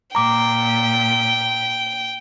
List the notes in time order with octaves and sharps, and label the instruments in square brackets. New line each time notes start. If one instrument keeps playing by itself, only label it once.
[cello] A#2 [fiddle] G5 [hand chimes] A#5 D6